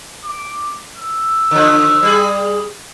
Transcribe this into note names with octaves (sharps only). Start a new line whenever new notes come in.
D6
E6
D3 F3
G3 G#4